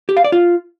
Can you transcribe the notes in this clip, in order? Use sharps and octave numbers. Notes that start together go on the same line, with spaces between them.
G4
F5
D5
F4